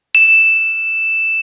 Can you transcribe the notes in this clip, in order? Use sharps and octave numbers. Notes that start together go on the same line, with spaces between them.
E7